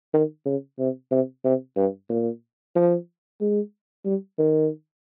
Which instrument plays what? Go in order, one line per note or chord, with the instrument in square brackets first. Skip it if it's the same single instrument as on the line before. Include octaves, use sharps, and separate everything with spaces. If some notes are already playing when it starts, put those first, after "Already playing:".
[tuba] D#3
C#3
C3
C3
C3
G2
A#2
F3
G#3
G3
D#3